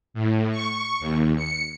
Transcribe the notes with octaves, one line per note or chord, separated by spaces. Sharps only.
A2
C#6
D#2
C#7